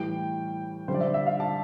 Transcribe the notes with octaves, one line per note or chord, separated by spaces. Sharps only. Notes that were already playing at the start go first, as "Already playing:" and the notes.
Already playing: A2 E3 G3 G5
D3 G3 C5
D5
E5
E5
F5
A5